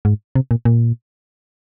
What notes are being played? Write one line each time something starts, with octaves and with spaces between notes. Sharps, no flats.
G#2
C3
A#2
A#2